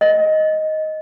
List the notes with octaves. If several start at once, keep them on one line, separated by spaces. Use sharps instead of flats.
D#5